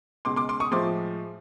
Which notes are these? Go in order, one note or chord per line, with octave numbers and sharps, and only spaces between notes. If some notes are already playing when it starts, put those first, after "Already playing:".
C#2 B2 G#3 C6 D6
C6 D6
C6 D6
C#6 D#6
A2 F3 G#3 C6 D6